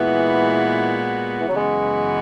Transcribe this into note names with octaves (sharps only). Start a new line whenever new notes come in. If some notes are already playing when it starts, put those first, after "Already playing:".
Already playing: A#2 E3 G#3 B3 F#4
E3
F#3
F#2 C#3 E3 G#3 B3 F#4